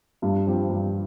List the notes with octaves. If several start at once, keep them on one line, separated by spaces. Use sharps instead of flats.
G2
F3 C4 G4
G2